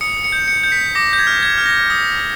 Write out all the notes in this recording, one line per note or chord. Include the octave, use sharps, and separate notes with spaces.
D#6 C#7
C#7
G6
C#7
G6
B6
D6 A#6
G6
G#6
F6
G#6
F6
A#6
D#6